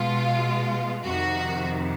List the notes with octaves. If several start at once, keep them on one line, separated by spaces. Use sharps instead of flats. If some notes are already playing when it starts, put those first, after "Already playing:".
Already playing: B2 G#3 F4
F2 C3 D#3 F#4